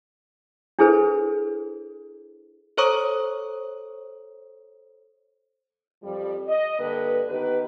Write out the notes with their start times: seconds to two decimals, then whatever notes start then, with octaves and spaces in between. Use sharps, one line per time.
0.79 D4 E4 G#4 A4 B4 C5
2.77 A4 C5 C#5 A#5 C#6 D#6
6.04 F2 F3 G3
6.48 D#5
6.79 G2 D3 A#3 B4
7.29 D#3 B3 G4 B4